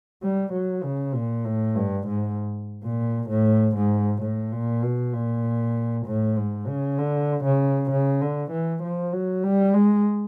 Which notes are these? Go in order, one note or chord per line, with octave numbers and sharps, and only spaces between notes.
G3
F#3
C#3
A#2
A2
G2
G#2
A#2
A2
G#2
A2
A#2
B2
A#2
A2
G#2
C#3
D3
C#3
C#3
D3
E3
F3
F#3
G3
G#3